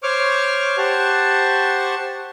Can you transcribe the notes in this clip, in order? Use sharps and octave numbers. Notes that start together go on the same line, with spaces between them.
C5 C#5 C#6 D6 F6
G4 C5 F#5 A5 C#6